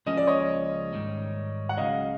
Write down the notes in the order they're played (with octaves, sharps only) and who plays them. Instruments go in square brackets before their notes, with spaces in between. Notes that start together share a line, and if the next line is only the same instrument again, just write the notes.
[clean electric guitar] C#2 C#3 F3 A#3 C#4 [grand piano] D#5
[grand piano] D5
C#5 D#5
[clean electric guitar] G#2 D#3 G3
[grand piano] F#5
[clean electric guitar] C#2 C#3 F#3 [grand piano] D#5 F5